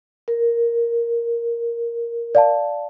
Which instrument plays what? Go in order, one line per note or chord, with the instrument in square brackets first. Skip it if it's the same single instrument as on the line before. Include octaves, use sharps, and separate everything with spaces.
[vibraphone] A#4
[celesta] D5 F5 A5